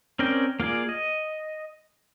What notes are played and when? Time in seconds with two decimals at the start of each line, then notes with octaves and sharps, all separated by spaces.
0.19 C4 C#4 A#4 D5 G5
0.60 A#3 F4 G#4 D5
0.89 D#5